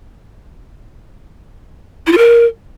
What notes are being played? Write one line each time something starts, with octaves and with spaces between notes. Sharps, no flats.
E4
F4
A#4